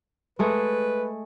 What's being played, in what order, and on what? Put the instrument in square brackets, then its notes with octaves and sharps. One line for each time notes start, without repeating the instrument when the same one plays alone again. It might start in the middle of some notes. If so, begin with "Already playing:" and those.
[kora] G#3 A3 G#4 [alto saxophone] B4